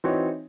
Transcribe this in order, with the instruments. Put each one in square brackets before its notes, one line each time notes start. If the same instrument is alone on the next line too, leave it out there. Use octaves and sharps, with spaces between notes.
[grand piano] E3 C4 D#4 F#4 C#5